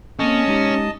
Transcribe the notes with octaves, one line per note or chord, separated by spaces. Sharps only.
A#3 C4 C#4 A4 D#5 A5
G#3 D#4 G4